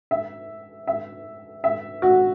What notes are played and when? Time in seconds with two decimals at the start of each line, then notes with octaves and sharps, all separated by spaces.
0.11 E5
0.87 E5
1.64 E5
2.02 F#4